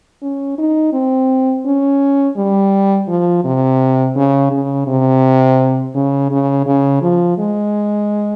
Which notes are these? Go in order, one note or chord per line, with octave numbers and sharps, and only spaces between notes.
C#4
D#4
C4
C#4
G3
F3
C3
C#3
C#3
C3
C#3
C#3
C#3
F3
G#3